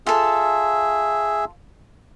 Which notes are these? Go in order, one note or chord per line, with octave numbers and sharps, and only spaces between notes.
F4 G#4 A4 E5